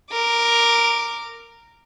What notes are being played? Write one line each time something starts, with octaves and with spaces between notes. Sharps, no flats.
A#4 D6